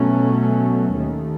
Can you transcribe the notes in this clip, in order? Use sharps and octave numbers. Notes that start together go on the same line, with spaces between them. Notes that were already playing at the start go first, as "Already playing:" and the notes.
Already playing: B2 F#3 A3 C#4
D#2 D#3 A3